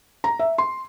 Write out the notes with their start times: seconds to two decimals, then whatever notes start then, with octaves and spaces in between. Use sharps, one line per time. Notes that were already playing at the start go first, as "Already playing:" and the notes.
0.24 A#5
0.39 E5
0.58 C6